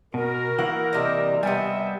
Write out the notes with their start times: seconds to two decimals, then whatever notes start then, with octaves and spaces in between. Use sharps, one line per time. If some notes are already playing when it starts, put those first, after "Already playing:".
0.14 B2 F#4 A#4
0.59 E3 A#3 F#5
0.93 C3 G3 D#5 E5
1.43 C3 G3 B3 D#5 E5 G#5